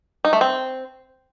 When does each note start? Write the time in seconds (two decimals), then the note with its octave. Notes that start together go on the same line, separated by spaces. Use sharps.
0.25 D#4
0.33 A3
0.41 C4